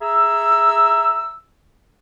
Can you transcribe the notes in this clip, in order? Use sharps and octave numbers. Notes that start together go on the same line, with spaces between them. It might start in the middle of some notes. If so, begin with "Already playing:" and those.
G#4 E5 A#5 E6